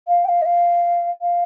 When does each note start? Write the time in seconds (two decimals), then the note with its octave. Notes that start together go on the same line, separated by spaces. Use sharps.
0.08 F5
0.25 G5
0.28 F5
0.42 D#5
0.45 F5
1.21 F5